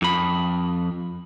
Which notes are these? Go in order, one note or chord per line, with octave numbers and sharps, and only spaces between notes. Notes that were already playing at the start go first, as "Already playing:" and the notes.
F2 B5